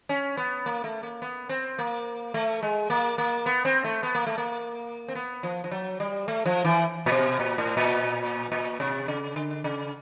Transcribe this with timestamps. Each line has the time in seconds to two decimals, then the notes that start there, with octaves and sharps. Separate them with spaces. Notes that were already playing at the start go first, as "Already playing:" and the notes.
0.09 C#4
0.37 B3
0.66 A#3
0.84 A3
1.03 A#3
1.22 B3
1.49 C4
1.79 A#3
2.34 A3
2.63 G#3
2.90 A#3
3.18 A#3
3.46 B3
3.65 C4
3.84 A3
4.03 B3
4.15 A#3
4.27 A3
4.38 A#3
5.08 C4
5.15 B3
5.43 F3
5.64 F3
5.71 F#3
6.00 G3
6.28 A3
6.46 F3
6.64 E3
7.06 A#2
7.12 B2
7.40 A#2
7.58 A2
7.77 A#2
8.52 A#2
8.80 C3
9.08 C#3
9.36 D3
9.64 C#3